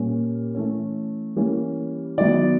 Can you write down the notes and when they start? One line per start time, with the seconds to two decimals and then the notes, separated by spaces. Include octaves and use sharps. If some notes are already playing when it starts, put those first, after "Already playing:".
Already playing: A#2 G3 A#3 C#4
0.55 E3 A3 C#4
1.36 E3 G3 A#3 C#4
2.18 D#3 F#3 B3 D5